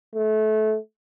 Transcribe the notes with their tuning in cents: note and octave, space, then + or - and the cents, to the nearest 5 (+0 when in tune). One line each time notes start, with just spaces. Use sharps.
A3 -25